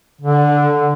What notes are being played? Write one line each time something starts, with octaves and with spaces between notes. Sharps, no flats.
D3